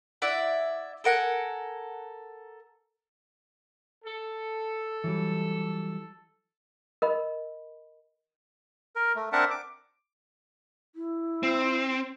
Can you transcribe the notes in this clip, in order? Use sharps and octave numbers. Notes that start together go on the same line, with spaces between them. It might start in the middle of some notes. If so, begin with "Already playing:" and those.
E4 D5 E5 F#5
A4 A#4 F#5 G#5
A4
E3 F#3 G3
A#4 D#5 B5
A#4
A3
C4 D4 A#4 E5 F#5 A5
D6
E4
C4